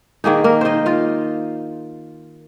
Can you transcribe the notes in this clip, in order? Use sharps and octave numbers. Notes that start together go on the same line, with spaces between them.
D#3 A#3 D#4 G#4
A#3 A#4
D#4 C5 D#5
F4 F5